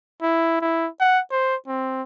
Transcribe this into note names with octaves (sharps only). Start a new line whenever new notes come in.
E4
E4
F#5
C5
C4